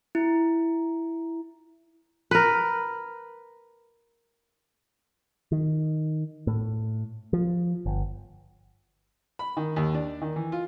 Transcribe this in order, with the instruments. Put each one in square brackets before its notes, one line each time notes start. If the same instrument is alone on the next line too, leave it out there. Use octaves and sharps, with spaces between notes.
[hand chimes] E4
[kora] A#4 B4
[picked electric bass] D#3
A2
F3
G1
[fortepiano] B5
D#3
D#2
D4
D#3
E3
F4